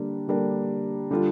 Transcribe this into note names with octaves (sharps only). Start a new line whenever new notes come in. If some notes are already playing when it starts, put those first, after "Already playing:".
Already playing: D3 G3 A#3 D4
D3 G3 A#3 D4
D3 G3 D4 F4